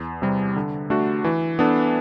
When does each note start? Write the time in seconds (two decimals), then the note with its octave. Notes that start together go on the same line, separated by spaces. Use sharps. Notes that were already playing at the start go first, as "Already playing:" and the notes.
Already playing: E2
0.22 C3 G3
0.56 D3
0.90 A3 D4 F#4
1.24 E3
1.59 B3 D4 A4